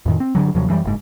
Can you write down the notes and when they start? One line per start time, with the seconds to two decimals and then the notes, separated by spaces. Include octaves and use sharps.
0.06 F2 A2 D#3
0.20 C4
0.35 G2 D3 F#3
0.55 D#2 C3 F3 F#3
0.68 F#2 E3 F#3 G3
0.85 F#1 G#2